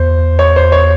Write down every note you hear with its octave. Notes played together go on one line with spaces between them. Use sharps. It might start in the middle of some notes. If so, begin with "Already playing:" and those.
Already playing: E2 C5
C#5
C5
C#5